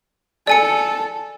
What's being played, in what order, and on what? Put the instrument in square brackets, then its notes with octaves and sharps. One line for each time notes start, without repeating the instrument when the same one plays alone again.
[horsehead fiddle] A4 [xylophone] D5 G#5 C#7